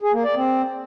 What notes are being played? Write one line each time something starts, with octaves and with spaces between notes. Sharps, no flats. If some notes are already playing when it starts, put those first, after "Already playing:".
G#4
A#3
D5
C4